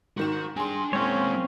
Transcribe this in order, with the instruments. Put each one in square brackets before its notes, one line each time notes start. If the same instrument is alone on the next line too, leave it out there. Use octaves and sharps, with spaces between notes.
[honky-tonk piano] G#2 D#3 E7 [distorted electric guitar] F#4
[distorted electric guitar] D4 G5 [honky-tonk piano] G#4 C6
[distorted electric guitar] G#3 E4 [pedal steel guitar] A#3 C4 C#5 [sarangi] C#4